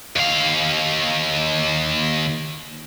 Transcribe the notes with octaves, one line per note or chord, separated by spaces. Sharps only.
D#2 F5